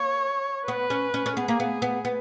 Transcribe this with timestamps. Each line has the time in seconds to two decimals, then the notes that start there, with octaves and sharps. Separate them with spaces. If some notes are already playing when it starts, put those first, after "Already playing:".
Already playing: A#3 C#5
0.67 B3 B4
0.90 C#4
1.14 C#4
1.26 C#4
1.36 B3 G#4
1.48 A#3
1.60 B3
1.82 B3
2.05 B3